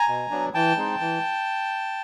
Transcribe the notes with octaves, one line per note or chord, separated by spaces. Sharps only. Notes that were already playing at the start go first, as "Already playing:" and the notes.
Already playing: G#5 A#5
B2
F#3 B3 D4
E3 G5 A5
G#3 C4 D#4
E3